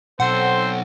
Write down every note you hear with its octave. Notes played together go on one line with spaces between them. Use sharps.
B1 C4 A4 C5 F#5